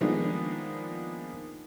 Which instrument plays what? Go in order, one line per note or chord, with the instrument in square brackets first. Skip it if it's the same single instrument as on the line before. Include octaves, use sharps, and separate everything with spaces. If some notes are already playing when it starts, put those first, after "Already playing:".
[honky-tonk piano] D#3 F3 G#3 A#3 B3 D4